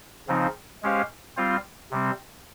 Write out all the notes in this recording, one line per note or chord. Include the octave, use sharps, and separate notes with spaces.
C#3 F3 C4 D#4
G#3 C#4 G4 C5 F5
G3 C4 F4 C5 F5
C3 G3 C4